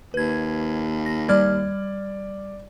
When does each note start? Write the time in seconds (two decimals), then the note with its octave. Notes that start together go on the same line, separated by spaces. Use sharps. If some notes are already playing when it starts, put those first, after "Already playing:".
0.14 D#2 B4 G#6
1.06 A#6
1.29 G3 D5 F6 G#6